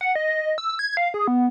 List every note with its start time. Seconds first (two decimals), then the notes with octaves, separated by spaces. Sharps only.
0.01 F#5
0.15 D#5
0.58 E6
0.79 G#6
0.97 F5
1.14 G#4
1.28 B3